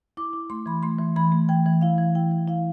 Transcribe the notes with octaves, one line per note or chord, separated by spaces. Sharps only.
E4 D6
E4
A3 C6
E3 B5
A3 C6
E3
E3 B5
A3
E3 G5
E3
E4 F5
E3
E4 G5
E3
E4 F5